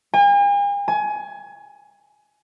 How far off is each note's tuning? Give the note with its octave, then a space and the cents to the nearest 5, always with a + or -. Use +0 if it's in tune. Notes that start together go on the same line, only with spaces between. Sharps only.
G#5 -45
G#5 +25